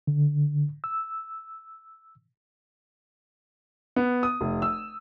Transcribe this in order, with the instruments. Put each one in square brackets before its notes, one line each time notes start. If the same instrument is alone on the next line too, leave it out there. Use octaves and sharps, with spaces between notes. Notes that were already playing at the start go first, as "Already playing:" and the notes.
[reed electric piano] D3
E6
[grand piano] B3
D#6
F1
E6